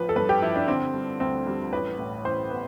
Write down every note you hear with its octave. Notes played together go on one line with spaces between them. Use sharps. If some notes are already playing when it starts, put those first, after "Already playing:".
Already playing: A1 F3 B4
A4
G2 B4
G4
F3 E4
D4
D3 C4
G3
D2 C4
G3
A1 B4
A2
A1 C5
B3